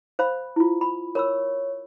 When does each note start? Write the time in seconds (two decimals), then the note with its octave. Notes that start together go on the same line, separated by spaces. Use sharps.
0.19 C5 F5 B5
0.56 E4 F4
0.81 B5
1.15 A#4 C#5 B5 E6